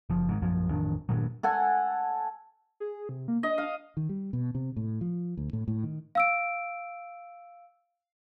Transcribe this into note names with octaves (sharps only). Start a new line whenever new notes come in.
F#1 F3
G#2 D#3
A#1 F#2 F3 F#3
A1 F2 D#3 D4
G2 A#2 D#3 F#3
A4 F#5 G#5
G#4
C3
A#3
D4 D#5
F5
D#3
G3
B2
C3
A2
F3
D2
A2
A2
D#3
F5 E6 D7